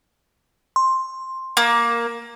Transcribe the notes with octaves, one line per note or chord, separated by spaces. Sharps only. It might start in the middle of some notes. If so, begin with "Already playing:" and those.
C6
A#3